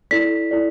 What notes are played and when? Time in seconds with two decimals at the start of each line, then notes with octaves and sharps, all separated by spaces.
0.11 E4 A4 D5 B6
0.51 E4 A4 D5